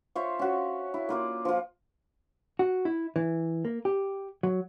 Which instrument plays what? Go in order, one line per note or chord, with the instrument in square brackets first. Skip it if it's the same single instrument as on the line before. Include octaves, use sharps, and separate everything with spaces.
[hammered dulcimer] F4 C5 C#5 E5
C#4 F#4
E4
A#3 F4 D5
F3 F4
[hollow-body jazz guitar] F#4
E4
E3
A#3
G4
F#3